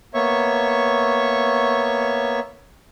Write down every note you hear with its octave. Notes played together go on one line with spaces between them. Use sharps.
A#3 B3 C#5 E5 C#6